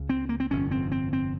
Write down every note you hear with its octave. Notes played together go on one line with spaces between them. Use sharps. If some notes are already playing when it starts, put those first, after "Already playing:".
Already playing: C#2 C#3
C4
A#3
C4
G1 F2 C3 C#4
C4
C4
C4